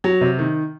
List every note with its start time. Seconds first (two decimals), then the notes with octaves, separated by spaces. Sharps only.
0.04 F#3
0.21 C3
0.39 D#3